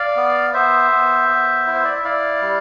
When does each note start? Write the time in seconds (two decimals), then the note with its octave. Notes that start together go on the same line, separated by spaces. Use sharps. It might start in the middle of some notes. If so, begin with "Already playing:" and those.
Already playing: D5 F5
0.16 B3
0.54 B3 C5 E5
0.91 B3
1.29 B3
1.67 E4
1.75 C5
1.85 D5
1.94 E5
2.04 E4 D5 F5
2.42 G3